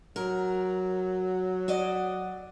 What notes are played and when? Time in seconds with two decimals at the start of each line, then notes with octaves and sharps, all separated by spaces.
0.16 F#3 A#4
1.68 F#4 D5 D#5